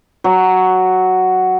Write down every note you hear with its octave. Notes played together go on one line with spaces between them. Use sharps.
F#3